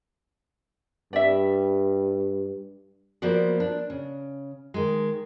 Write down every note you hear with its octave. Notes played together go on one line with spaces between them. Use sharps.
G2 D5 E5
F3 A#3 B3 F#4 C5 D5
D4
C#3
D#3 G#3